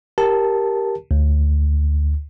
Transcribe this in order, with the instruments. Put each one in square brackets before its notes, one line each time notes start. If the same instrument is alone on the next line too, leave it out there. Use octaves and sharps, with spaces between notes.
[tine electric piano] G4 A#4 A5
D2